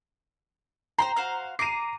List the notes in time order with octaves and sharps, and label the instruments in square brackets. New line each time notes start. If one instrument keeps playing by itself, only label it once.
[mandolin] C5 G5 C6 [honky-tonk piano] A#5
[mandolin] F#4 C5 F5
[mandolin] A#5 D6 [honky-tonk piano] C7 D#7